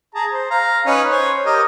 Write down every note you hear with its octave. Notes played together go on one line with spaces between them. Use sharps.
G#4 A5 A#5
C5
F5 A#5
C#4 D#4 B4
C5 C#5
G4 A#4 D#5